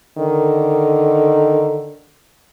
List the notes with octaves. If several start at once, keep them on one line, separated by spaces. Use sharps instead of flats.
D3 D#3